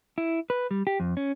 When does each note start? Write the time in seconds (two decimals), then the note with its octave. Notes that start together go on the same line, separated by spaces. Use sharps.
0.18 E4
0.50 B4
0.71 G3
0.87 G4
1.00 F2
1.17 C#4